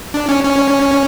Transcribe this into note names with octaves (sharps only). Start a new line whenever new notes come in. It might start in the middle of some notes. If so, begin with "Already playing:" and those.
D4
C#4
C#4